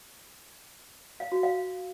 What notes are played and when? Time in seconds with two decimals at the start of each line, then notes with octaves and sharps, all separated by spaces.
1.20 F5
1.32 F#4
1.43 F5